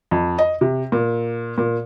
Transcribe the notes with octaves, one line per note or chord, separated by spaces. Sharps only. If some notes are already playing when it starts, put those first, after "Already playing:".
F2
D#5
C3
A#2
A#2